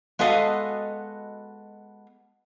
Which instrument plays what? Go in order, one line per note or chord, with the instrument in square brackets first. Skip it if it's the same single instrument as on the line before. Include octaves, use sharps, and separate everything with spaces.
[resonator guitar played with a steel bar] G#3 B3 F#4 A4 D#5 F5